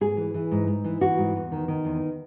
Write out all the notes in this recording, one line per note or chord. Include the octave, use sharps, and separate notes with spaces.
G#2 G#4
E3
E3
G#2
G#2
E3
E3 F#4
G#2
E2
D#3
D#3
E2